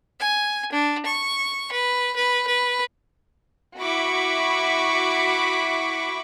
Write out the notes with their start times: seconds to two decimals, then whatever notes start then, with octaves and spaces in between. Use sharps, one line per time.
0.20 G#5
0.72 D4
1.06 C#6
1.72 B4
2.16 B4
2.47 B4
3.79 E4 F#4 B5 C#6 D6 B6